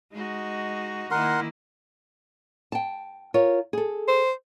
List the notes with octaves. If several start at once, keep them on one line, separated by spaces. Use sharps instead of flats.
G#3 D#4 F#4
D#3 A#3 E4 A#4 F#5 C6
G5 A5
F4 A#4 C#5
G#4 A4
C5